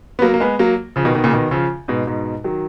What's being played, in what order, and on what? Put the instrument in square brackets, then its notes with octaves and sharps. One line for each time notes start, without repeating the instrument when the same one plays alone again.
[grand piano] B3
F#3 A#3
A#3
G#3 B3
F#3 A#3
C#3 F3
B2 D#3
B2 D#3
A#2 C#3
B2 D#3
C#3 F3
G#2 B2
G#2 B2
D#3 F#3